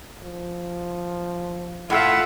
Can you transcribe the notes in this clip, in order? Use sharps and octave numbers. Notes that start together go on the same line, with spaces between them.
F3
A2 F4 A4 E5 F#5